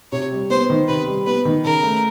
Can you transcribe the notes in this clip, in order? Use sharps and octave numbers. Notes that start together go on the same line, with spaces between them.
C3 C#5
G3
B3 C5
D#3
C3 B4
G3
B3 B4
D#3
C#3 A#4
A3